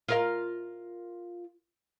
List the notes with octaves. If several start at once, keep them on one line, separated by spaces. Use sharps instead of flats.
F4 A#4 F5